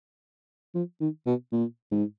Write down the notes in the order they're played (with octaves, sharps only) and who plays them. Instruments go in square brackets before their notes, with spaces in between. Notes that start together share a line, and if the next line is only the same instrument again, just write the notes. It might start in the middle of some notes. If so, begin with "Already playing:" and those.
[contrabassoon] F3
D#3
B2
A#2
G#2